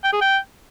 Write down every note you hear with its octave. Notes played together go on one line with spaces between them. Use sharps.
G5
G#4
G5